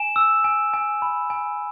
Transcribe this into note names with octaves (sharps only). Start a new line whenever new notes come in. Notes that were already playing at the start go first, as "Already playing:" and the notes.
Already playing: G#5 E7
E6
G#5
G#5
B5
G#5